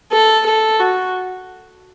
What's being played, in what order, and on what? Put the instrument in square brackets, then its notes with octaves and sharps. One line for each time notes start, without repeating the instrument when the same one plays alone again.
[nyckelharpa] A4
A4
F#4